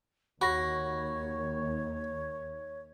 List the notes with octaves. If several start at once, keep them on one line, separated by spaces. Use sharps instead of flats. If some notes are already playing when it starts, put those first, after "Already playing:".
D#2 F#4 C#5 B5 C#6 A#6